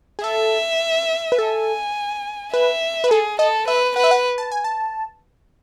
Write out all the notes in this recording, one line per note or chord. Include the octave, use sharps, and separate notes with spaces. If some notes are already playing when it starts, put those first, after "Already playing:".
G#4
A4 E5
B4
A4 G#5
B4 E5
B4
G#4 A4
A4 D#5
B4 E5
B4 F#5
E5
F#5
A5
G#5
A5